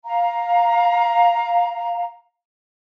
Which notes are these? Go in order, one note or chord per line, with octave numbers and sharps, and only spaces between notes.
F5 A#5